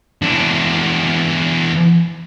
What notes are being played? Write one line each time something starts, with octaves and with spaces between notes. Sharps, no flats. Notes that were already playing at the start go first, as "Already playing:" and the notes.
E2 D4